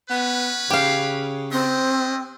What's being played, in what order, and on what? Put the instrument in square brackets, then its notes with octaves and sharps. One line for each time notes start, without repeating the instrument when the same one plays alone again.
[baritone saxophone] B3 [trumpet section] C#4 B4
[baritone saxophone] C#3 [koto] G4 F5
[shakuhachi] C4 [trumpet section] D4 D#5